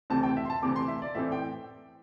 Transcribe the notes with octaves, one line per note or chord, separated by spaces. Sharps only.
D2 C3 E3 C4 A5
G5
E5
C6
A5
D2 C3 E3 C4 D6
C6
E5
D5
A2 E3 A3 C4 E5
G5